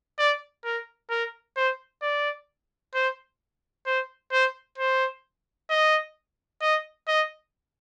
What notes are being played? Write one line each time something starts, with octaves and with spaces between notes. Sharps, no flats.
D5
A#4
A#4
C5
D5
C5
C5
C5
C5
D#5
D#5
D#5